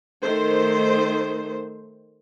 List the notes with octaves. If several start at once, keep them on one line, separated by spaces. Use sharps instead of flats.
D#3 A3 C5